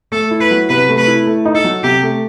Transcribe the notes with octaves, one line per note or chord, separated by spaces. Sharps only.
A3 A4
E4
B4
F#3
C3 B4
A3
B4
E4
A3
D#4
A4
F#3
C3 G4
A3